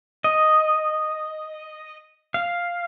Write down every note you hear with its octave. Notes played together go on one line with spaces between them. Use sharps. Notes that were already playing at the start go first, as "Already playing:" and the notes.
D#5
F5